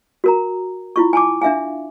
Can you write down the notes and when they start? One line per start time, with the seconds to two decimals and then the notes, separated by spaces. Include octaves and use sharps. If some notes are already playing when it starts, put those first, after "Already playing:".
0.24 F#4 A#4 A#5
0.96 E4 F4 C#6
1.13 G#5 A5 D6
1.42 D4 E5 F5 G#5